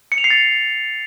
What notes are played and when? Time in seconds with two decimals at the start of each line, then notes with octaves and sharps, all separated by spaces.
0.12 C#7
0.18 F7
0.24 C7
0.30 A6